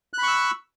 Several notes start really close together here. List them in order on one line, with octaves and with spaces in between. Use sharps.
F#6 B5 C#6 E6